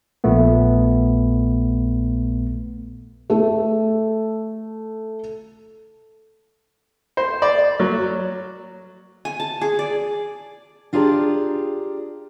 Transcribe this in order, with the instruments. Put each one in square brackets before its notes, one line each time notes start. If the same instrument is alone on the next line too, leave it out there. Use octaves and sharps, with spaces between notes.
[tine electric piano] A#1 A#2 A3 B3
[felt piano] A3 A4
[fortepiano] C5
D5
F#3
[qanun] G#5
A5
G#4
D5
[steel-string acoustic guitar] D4 F4 G4 G#4 D5 A#5